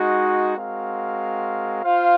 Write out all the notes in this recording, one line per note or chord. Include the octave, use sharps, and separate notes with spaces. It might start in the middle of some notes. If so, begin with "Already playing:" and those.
Already playing: G#3 D#4 F#4
G#3 C4 F#4 A#4 F5
F4 C5 F5